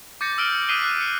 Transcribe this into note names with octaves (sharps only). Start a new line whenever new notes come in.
D6 G6 A6 A#6 C#7
E6 F6 D7 G7
D#6 F#6 B6 C7 D#7 G7
F#6
C#7